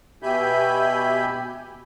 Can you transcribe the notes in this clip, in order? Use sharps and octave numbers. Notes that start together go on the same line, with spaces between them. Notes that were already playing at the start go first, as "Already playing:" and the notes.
B2 G4 E5 G#5 B5 G6